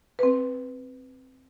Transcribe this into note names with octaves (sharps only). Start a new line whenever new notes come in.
C4 B4